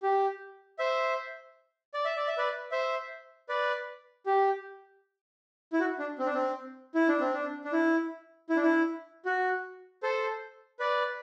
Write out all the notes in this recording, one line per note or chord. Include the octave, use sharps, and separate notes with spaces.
G4
C5 E5
D5
E5
D5
E5
B4 D5
C5 E5
B4 D5
G4
E4
F#4
D4
C4
D4
C4
E4
D4
C4
D4
D4
E4
E4
D4
E4
F#4
A4 C5
B4 D5